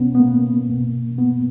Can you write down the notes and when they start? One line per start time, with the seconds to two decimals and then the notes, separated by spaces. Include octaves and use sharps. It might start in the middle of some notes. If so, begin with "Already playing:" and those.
Already playing: B2 B3 C#4
0.15 B3
0.19 A#3
0.69 B2
1.18 B3